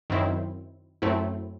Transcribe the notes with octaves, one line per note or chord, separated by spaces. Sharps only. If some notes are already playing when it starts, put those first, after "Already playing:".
F#2 D#3 F#3 C4 E4
F#2 F#3 A3 C4 E4